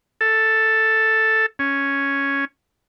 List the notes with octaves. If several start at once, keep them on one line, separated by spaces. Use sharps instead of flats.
A4
C#4